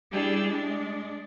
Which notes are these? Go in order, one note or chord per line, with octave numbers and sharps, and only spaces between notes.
G3 D4 E4 G4 G#4 E6
G#3 D4